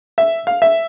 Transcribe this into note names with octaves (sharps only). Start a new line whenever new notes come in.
E5
F5
E5